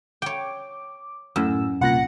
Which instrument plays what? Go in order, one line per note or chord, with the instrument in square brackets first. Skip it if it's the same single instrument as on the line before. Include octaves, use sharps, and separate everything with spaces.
[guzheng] C#5 G5 [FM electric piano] D6
[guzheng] F#2 [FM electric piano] A2 E6
[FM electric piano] C2 A#2 A#6 [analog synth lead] F#5